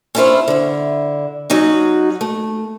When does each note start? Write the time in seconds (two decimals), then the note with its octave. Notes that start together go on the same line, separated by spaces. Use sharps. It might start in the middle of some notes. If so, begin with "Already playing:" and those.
0.15 C#4 D4 E4 F4 C5 C#5
0.48 D3 E4
1.50 F#3 C#4 D#4 F#4
2.21 A3